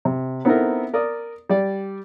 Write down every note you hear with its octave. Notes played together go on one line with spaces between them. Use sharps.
C3
B3 C4 D#4 E4 A4 A#4
A#4 D5 D#6
G3 D5